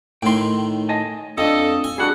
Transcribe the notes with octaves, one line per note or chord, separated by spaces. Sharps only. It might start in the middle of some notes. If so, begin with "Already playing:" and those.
A2 D#3 G5 C6
D#5 G#5 A5
F2 C4 D4 A4 D#5
G#5
G3 D4 F#4 G#4 A4 F#5